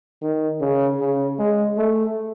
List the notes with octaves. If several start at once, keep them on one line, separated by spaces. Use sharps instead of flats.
D#3
C#3
C#3
G#3
A3